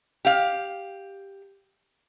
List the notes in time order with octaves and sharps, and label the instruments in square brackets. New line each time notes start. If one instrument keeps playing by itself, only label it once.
[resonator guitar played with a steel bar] G4 F5